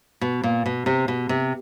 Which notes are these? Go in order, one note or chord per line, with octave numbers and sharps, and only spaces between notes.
B2
A#2
B2
C3
B2
C3